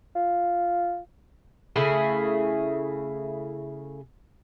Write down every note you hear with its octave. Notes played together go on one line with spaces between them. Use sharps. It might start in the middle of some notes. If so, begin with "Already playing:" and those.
F4
C#3 A3 E4 G#4